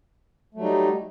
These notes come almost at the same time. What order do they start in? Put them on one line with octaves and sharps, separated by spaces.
A3 F#3 G3 D#4